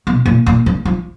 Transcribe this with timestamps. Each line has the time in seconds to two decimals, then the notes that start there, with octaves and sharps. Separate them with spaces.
0.07 B2
0.26 A#2
0.46 A#2
0.66 C#3
0.85 F3